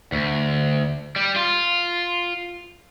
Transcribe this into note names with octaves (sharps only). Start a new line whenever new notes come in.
D2
G3
F4